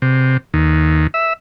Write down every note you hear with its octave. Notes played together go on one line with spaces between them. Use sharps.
C3
D#2
E5